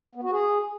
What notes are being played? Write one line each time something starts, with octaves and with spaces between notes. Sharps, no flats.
B3
F#4
G#4